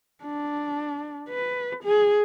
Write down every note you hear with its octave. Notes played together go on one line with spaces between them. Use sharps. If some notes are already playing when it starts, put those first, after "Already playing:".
D4
B4
G#4